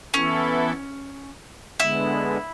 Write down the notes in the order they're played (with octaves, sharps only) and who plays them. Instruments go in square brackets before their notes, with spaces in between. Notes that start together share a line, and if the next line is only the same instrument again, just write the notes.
[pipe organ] E3 B3 E4 A4 [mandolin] C#4
[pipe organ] D3 G#3 B3 [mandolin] E4